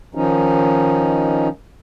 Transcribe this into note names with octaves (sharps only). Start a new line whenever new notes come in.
D#3 F3 C#4 D#4